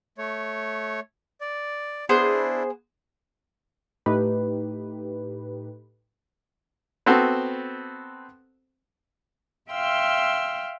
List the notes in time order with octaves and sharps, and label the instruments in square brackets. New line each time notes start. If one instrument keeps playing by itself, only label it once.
[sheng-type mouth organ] A3 C#5
D5
[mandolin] B3 G#4 C5 [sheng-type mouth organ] D4 E4
[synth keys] A2 A3 D#4 G4 B4
[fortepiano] B3 C4 F#4 A4 C5
[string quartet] E5 F5 G5 C6 E6 F6